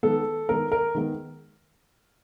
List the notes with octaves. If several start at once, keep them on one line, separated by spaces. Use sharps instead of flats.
D#3 G#3 B3 A4
D#3 G#3 B3 A#4
A#4
D#3 G#3 B3